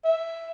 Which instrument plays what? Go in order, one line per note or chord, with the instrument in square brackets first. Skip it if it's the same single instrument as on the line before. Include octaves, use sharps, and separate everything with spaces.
[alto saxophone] E5